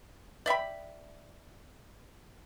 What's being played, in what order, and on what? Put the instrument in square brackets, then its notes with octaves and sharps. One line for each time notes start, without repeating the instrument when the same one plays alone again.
[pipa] D5 E5 G5 B5